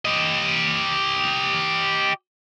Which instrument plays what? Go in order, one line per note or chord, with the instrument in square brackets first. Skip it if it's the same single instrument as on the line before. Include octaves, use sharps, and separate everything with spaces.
[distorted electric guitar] G4 D#5